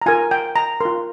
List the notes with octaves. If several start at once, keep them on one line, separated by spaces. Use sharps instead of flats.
A#5
F4 A#4 G#5
G5
A#5
F4 A#4 C6